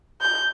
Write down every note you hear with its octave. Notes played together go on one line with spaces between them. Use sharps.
G6